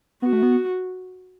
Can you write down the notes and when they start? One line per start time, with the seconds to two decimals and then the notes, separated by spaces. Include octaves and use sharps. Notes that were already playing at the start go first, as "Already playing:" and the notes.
0.22 B3 F#4
0.33 A3
0.43 B3